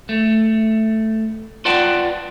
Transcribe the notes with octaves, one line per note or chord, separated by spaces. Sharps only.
A3
F4 B4 D5 F#5 G5 A5